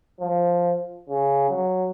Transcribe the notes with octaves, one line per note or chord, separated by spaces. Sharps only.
F3
C#3
F#3